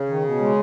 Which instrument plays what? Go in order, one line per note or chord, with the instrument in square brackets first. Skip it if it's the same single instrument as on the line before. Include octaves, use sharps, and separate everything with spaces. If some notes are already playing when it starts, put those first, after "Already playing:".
Already playing: [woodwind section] C#3
[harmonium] D#3
B2
G#3